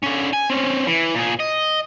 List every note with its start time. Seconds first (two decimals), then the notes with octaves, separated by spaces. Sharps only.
0.03 D3 C#4
0.33 G#5
0.50 C4 C#4
0.87 E3
1.15 A#2 G#4
1.40 D#5